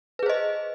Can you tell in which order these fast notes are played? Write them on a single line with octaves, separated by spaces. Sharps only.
B4 G#4 C5 D#5